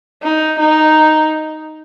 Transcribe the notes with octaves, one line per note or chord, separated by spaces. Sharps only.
D#4
D#4